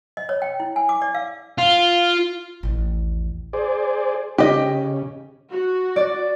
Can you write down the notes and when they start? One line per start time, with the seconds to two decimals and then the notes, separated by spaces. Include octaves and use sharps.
0.17 D#5
0.29 C#5
0.42 G5
0.60 E4
0.76 G#5
0.89 D6
1.02 D5
1.14 F5
1.58 F4
2.63 A1 D#2
3.53 G#4 C5 D5
4.38 C#3 G4 D#5
5.50 F#4
5.96 D5